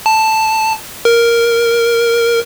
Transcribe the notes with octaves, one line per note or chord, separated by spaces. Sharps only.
A5
A#4